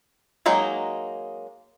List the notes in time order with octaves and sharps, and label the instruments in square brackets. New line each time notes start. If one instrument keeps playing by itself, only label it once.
[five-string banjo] F#3 G#3 A#3 D#4